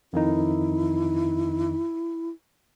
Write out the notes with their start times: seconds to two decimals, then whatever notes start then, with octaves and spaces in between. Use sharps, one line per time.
0.13 F2 D#3 D#4 E4